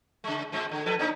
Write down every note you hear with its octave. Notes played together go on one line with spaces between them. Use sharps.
C#3 G#3
A2 G#3 C4
D3
F3 A4 B4
A#3 D4 D#4